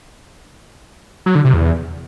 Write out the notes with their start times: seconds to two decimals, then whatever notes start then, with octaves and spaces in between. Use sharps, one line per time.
1.26 F#3
1.35 D3
1.45 C3
1.54 E2